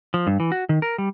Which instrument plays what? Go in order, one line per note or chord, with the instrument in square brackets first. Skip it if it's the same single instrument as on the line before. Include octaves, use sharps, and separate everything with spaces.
[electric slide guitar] F3
G2
E3
F#4
D#3
A#4
G3